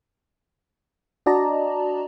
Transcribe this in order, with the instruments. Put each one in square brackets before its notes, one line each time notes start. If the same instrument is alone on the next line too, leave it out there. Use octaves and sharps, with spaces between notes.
[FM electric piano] D4 F#4 D5 D#5 A5 A#5